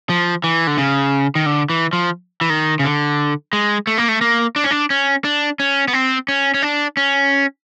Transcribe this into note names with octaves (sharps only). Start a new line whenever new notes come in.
F3
E3
D3
C#3
D#3
D3
E3
F3
E3
D#3
C#3
D3
G#3
A3
A#3
A3
A#3
D4
C#4
D4
C#4
D4
C#4
B3
C4
C#4
C#4
D4
C#4